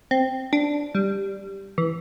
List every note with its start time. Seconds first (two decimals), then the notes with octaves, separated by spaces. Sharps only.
0.11 C4
0.53 D4
0.95 G3
1.78 E3